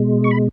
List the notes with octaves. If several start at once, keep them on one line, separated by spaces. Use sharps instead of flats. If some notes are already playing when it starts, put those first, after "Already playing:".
Already playing: B2 G#3
C#6
B5